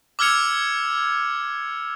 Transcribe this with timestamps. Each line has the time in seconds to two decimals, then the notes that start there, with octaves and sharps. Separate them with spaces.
0.19 D6 E6 F6 G#6 C#7 F7